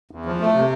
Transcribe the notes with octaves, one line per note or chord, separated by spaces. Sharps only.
E2
F3
A3
C3